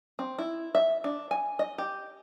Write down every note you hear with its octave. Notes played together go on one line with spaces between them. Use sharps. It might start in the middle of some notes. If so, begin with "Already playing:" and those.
C4
E4
E5
D4
G#5
D#5
G4